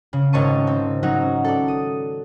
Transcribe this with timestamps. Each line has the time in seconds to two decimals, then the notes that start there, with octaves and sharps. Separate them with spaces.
0.13 C#3
0.33 G#1 C#5 D#5 A5 C#6 D#7
0.67 C4
1.03 F#3 C#4 D#4 F#4
1.44 A4 D5
1.68 D#6